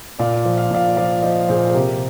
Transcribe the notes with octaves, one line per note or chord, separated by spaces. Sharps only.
A#2 D5 F5
F3
F5
A#2 D5 F5
F3 D5 F5
F3 C5 D#5
A#2 G#4 C5
C5
C3 G4 A#4